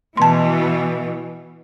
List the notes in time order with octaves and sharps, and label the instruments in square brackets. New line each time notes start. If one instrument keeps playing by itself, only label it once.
[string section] B2 E3 [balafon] A5 C6